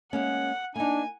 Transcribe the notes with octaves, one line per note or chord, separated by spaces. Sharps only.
G#3 A#3 C#4 F#5
A#3 D4 D#4 G#5